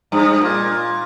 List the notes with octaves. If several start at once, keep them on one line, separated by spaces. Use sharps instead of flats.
G2
A#2